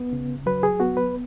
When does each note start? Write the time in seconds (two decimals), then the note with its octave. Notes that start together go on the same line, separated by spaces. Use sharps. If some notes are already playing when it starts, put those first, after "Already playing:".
Already playing: B3
0.13 C#3
0.46 F#3 B4
0.63 G#4
0.80 B3 F#4
0.97 B4